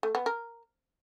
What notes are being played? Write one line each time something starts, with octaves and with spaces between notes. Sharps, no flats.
A3
B3
A#4